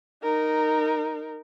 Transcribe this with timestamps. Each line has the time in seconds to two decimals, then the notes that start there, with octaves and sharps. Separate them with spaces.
0.23 D#4 A#4